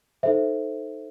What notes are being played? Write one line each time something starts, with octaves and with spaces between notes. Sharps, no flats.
D#4 A4 C5 E5